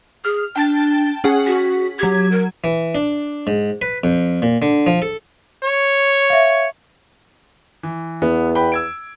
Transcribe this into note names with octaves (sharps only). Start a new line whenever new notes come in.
G#4 F6
D4 G5 A5 A6
C#4 G#4 F#5
F#4 B6
F#3 G4 G#6
A#4
E3
D4
G#2
B4
F2
A#2
D3
F3
A4
C#5
E5 F5
E3
E2 B3
B4 G5 B5
E6 G#6 D7